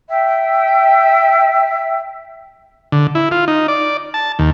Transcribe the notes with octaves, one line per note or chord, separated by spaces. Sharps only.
E5 G5
D3
E4
F4
D#4
D5
A5
D#2